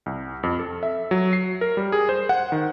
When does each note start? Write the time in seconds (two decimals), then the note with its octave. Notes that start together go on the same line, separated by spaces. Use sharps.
0.06 C2
0.43 F2
0.59 A4
0.83 E5
1.11 F#3
1.33 C7
1.61 A#4
1.77 G3
1.92 G#4
2.09 C5
2.29 F#5
2.52 D#3